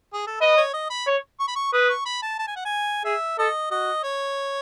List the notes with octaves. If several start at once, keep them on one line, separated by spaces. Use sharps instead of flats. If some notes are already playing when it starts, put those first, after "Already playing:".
G#4
A4
B4 D#5
C#5
D#5
B5
C#5
C#6
B5
C#6
B4 D#6
C#6
B5
A5
A5
G#5
F#5
G#5
G#4 E5
A4 D#5
F#4 D#5
C#5